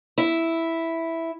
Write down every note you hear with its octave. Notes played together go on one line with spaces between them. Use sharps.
E4